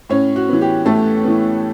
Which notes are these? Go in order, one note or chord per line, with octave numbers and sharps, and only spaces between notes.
A2 C#4 C#5
F#4
E3 B3
G4
A2 A3 A4
E3 B3